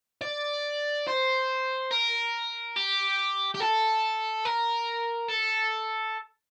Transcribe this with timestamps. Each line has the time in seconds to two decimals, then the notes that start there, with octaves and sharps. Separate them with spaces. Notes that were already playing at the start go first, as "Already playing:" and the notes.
0.22 D5
1.07 C5
1.91 A#4
2.76 G4
3.54 G4
3.60 A4
4.45 A#4
5.29 A4